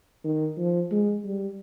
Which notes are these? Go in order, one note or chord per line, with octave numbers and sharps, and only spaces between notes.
D#3
F3
G#3
G3